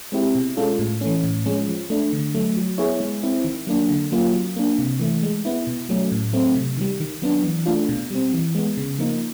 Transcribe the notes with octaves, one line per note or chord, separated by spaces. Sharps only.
G#3 C4 E4 G4
B2
G#3 C#4 F4 A4
A2
E3 A3 C#4
A2
F3 G#3 C#4
F3
A3 D4
D3
F#3 A3
F#3
B3 E4 G#4 C#5
G#3
C4 E4
D#3
F#3 A#3 D4
D3
F#3 A#3 C#4 F4
F#3
A#3 D4
C3
E3 A3
G#3
B3 E4
B2
F#3 A3 C#4
A2
F#3 A3 C4
C3
D#3 G3
D#3
F#3 B3 D4
E3
A3 D4 F4
B2
G3 C4
E3
G#3 B3
C#3
F3 A#3 D#4